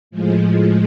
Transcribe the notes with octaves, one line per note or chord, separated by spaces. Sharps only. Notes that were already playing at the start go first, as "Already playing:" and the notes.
A2 F3 G#3